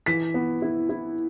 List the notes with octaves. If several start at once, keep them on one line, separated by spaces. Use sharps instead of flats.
E3 B6
B3
E4
E4